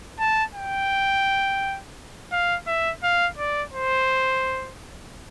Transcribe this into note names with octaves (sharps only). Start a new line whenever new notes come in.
A5
G5
F5
E5
F5
D5
C5